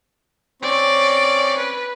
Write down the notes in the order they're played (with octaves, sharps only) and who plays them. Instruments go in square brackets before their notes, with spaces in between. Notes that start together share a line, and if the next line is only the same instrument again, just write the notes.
[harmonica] C4 C#4 C#5 [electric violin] D5
[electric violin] B4